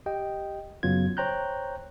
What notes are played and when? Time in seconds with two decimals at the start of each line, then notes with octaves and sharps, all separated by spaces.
0.06 G4 D#5 G5
0.83 F#2 C#3 F#3 B3 F4 G#6
1.17 C5 C#5 G5 A#5 F#6 G6